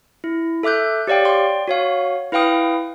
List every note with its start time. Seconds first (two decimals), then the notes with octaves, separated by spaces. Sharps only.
0.24 E4
0.63 A4 E5 D6 F#6 G6
1.07 G4 C#5 D5 F5 G5
1.25 D5 G5 C6
1.68 F#4 C#5 F5
2.32 E4 B4 F5 G5 D#6